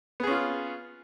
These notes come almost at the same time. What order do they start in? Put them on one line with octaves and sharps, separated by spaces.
B3 G#4 C#4 F4